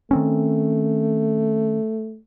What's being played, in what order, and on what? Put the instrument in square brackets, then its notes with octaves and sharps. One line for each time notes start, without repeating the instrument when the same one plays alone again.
[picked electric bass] D#3 C4 C#4 [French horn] A3